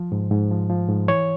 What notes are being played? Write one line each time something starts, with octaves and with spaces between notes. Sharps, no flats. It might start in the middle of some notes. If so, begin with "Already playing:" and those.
Already playing: F3
G#2
G#2
F3
F3
G#2
E3 C#5